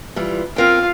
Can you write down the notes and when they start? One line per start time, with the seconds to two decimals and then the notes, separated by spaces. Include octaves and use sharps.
0.16 E3 G3 F4
0.56 C4 F4 A#4 F5 G5